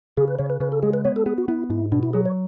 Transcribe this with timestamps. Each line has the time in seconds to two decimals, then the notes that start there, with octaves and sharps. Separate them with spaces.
0.17 C#3 G#4
0.28 B4
0.39 C#3 C#5
0.50 B4
0.60 C#3 B4
0.72 A4
0.83 G#3 G#4
0.93 B4
1.05 B3 C#5
1.16 A4
1.26 B3 G#4
1.38 F#4
1.48 B3 E4
1.70 G#2 E4
1.92 B2 D4
2.03 E4
2.13 F#3 G#4
2.25 C#5